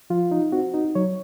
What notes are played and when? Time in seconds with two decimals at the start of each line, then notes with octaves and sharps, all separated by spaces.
0.10 F3 F4
0.31 D#4
0.52 C4 F#4
0.74 D#4
0.95 F#3 C#5